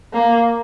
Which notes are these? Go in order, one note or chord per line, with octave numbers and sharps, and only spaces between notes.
A#3